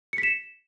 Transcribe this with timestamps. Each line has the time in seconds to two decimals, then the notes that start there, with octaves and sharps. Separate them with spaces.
0.13 C#7
0.18 B6
0.23 E7